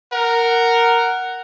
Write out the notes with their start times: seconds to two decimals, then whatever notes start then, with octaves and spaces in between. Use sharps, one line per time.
0.13 A#4 F#5